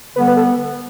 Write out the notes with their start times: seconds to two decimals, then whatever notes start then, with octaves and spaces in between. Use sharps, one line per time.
0.16 D3 G3 B3 B4
0.27 B4
0.37 A4